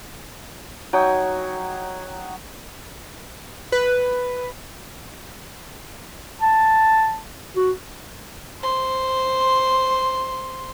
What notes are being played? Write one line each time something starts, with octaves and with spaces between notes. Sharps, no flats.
F#3 D#4 G5 G#5
B4
A5
F#4
C5 C6